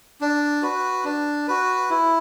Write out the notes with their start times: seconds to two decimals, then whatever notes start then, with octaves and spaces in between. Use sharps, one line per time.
0.21 D4
0.62 F#4 B4
1.04 D4
1.48 F#4 B4
1.90 E4